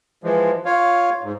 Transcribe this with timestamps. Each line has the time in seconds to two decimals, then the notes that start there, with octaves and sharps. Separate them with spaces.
0.24 E3 F3 G#3
0.65 F4 C#5 F5
1.23 G#2